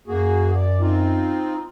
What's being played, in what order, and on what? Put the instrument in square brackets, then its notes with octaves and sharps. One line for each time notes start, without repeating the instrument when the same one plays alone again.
[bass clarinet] F#2 [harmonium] A#3 F#4 G#4
[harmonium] D5
C4 D#4 F4